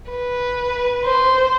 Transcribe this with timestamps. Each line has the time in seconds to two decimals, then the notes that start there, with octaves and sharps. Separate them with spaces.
0.11 B4
1.05 C5